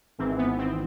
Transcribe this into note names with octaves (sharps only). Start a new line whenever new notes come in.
G#1 G#2 E3 C4
B3
C4